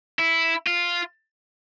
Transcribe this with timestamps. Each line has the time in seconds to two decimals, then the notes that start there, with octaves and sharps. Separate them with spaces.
0.19 E4
0.67 F4